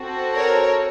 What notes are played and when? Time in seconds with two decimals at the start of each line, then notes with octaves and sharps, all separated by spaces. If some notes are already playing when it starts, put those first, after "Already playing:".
Already playing: C4 F#4 A4
0.34 A#4 C#5